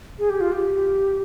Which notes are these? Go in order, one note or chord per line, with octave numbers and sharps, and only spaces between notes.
G#4
G4
F4
G4